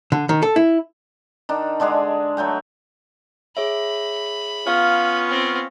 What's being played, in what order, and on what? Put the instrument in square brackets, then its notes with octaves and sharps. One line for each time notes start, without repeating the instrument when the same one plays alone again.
[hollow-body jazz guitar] D3
D#3
A4
E4
[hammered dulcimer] D#3 D4
D3 G#3 D4 G#4
F#3 A3 G5 G#5
[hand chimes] G#4 C#5 E5 [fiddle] B5
[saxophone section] B3 C#4 F4 [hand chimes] F5 F6
[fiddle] C4